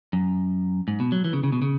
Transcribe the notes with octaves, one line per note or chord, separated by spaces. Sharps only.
F#2
G#2
B2
F#3
E3
C#3
C#3
B2
C#3